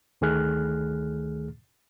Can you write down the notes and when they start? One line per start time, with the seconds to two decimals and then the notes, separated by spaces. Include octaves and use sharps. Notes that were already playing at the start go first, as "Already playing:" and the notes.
0.21 D2 D#3 A3 G#4 F6 F#6